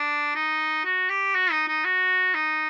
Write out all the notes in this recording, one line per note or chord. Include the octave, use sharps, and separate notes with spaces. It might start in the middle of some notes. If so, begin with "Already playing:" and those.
Already playing: D4
D#4
F#4
G4
F#4
D#4
D#4
F#4
D#4